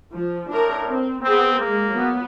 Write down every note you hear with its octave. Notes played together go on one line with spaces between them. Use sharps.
F3
A2 D4 A#4
C4
B3 C4 G#4
G#3 A#3
F#3 B3